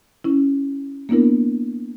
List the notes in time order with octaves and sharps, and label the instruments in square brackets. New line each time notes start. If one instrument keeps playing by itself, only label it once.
[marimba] C#4 E4
A#3 B3 D4 E4 A#4